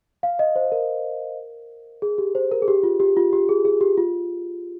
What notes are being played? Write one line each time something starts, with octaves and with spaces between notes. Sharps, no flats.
F5
D#5
C5
A#4
G#4
G4
C5
A#4
G#4
G4
F4
G4
F4
G4
G#4
G#4
G4
F4